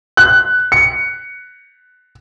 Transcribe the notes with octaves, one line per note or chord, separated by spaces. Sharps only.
F#6
C#7